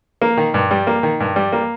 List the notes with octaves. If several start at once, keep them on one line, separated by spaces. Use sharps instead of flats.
A#3
D#3
G2
G3
A#3
D#3
G2
G3
A#3